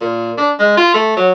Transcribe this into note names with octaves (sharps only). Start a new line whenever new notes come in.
A#2
D4
G#3
F4
A3
F#3